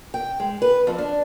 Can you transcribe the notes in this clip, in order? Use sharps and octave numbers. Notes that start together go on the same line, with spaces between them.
G5
G#3
B4
F2
D4